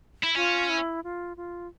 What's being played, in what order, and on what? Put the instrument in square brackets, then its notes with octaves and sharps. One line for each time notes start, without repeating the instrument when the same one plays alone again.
[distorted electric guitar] E4
[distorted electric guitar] C#4 [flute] F4
[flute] E4
F4
F4